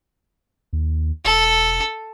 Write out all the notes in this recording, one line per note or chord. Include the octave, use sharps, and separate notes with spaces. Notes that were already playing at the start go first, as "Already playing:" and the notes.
D#2
E1 A4